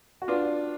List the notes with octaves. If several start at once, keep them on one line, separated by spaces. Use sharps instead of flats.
F#4
D4 F4 B4